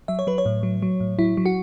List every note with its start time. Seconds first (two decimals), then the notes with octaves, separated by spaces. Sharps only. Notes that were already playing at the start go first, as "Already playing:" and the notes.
0.08 F#3 E5
0.19 C#5
0.27 F#3 B4
0.38 C#5
0.46 A2
0.63 F#3
0.82 F#3
1.00 A2
1.19 F#3 E4
1.37 F#3
1.46 F#4